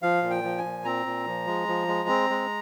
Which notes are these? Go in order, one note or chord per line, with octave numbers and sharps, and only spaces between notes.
F3 F5
A#2
G5
F3
G#5
A#2
C4 A#5
A#2
F3
G#3
F3
G#3
C4
G#3